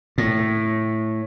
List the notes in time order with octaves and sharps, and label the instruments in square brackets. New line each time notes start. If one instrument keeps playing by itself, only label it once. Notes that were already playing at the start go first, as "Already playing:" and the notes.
[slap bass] A2